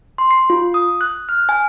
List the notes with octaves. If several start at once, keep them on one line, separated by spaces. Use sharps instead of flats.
C6
C7
F4
D#6
F#6
F6
G#5